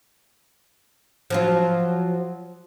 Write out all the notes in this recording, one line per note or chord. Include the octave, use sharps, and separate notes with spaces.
F3 F#3 F4